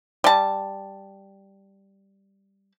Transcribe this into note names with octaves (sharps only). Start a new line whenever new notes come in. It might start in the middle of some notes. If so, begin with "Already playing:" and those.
G3 A5